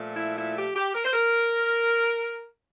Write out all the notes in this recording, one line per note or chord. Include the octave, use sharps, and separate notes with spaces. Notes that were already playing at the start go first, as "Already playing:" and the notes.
Already playing: A#2 F3 A3
E4
E4
G4
G4
A#4
C5
A#4